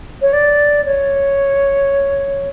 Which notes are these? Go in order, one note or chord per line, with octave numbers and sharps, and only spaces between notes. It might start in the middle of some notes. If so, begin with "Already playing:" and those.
C#5
D5
C#5